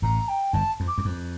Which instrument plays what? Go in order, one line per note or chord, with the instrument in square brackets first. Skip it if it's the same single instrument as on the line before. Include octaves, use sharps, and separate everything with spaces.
[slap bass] A1 A2 [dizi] A#5
[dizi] G5
[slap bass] G1 G2 [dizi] A5
[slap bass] F2
[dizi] D6
[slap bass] E2
F2